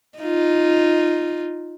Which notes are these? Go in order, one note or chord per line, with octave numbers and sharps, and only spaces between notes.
D#4 F4